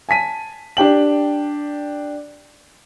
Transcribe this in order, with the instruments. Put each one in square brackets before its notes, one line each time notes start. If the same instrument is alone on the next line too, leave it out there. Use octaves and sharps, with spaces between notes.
[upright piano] G#5 A5 B6 D#7
D4 G4 G5 F#7